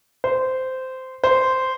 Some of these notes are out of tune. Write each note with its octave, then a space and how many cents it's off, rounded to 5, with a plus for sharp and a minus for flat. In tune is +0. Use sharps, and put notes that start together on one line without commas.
C5 -15
C5 -10